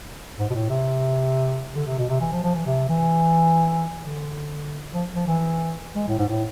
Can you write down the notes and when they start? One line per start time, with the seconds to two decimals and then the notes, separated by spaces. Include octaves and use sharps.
0.39 G#2
0.50 B2
0.55 A2
0.69 C3
1.75 D3
1.87 C3
1.98 B2
2.09 C3
2.20 E3
2.32 F3
2.43 F3
2.55 E3
2.66 C3
2.89 E3
4.02 D3
4.93 F3
5.16 F3
5.27 E3
5.95 G#3
6.07 A2
6.18 G#2
6.29 A2